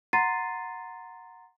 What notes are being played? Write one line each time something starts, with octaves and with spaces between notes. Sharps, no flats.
F#5 A#5 C6 A6 C7 D#7